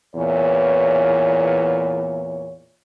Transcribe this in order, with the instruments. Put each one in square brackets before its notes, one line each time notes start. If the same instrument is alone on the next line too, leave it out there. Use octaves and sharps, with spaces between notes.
[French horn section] E2 A#2 E3 C#5